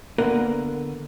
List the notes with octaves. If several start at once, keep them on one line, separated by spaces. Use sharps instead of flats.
D3 A#3 B3 A#4 B4 F#5